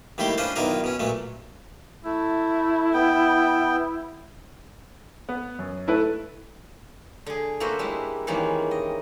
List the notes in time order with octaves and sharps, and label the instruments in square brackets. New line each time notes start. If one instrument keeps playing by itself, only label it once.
[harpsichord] D#2 G3 A3 E4 G4 C6
C#4 D4 F4 B4 C5
B1 D#3 E4 F4 A#4 D5
B2 C#4
A#2 F#3 A3
[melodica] A3 [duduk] E4
[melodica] B3 G5
[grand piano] B3
F#2
A3 E4 A4 B4
[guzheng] D3 G#4
A3 A#3 F#4 B4 C5
G3 G#3 D4 E4
D#3 E3 G3 G#3 A#3 C#4
D#5